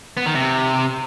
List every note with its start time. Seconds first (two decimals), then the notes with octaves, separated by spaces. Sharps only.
0.17 B3
0.26 D#3
0.35 C3